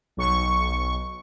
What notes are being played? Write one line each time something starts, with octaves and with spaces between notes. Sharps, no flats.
B1 C#6